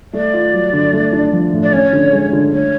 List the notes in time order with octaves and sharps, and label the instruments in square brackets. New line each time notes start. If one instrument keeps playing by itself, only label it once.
[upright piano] A3 [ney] D5
[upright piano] F4
F#3
D3
A3
D4
F3
A2
[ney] D5
[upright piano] C#4 [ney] C#5
[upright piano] D3
G#3
D3
[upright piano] A3 [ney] C#5